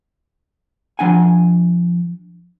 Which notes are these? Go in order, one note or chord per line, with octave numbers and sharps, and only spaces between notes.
F3 D4 F#5 G#5